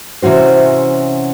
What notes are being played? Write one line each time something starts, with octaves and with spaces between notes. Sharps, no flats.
C3 E3 C#4 F#4 C5